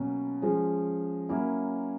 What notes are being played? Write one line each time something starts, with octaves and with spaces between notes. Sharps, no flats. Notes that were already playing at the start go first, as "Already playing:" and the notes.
Already playing: B2 F#3 A#3 C#4
F3 G#3 C#4
F#3 A#3 C#4 E4